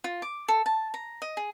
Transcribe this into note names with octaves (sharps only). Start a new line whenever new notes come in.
F4
D6
A4
A5
A#5
D#5
G#4